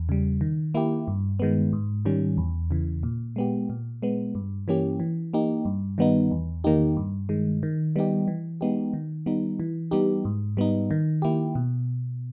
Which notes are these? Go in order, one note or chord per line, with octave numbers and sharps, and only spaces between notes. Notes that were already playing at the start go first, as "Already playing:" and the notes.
Already playing: E2
C#3 G3
D#3
A#3 E4 G4
G2
D#3 G#3 B3
G#2
D#3 G3 C#4
E2
C#3 E3
A#2
G#3 B3 G4
A#2
G#3 B3
G2
E3 A#3 C#4 G4
E3
A#3 D#4 G4
G2
D#3 G3 B3 D#4
E2
D#3 A#3 D#4 G4
G2
D#3 G#3
D#3
G3 B3 D#4 G4
E3
G#3 B3 D#4 G4
D#3
G3 B3 D#4
E3
G3 B3 D#4 G4
G#2
G3 B3 D#4
D#3
A#3 E4 G4
B2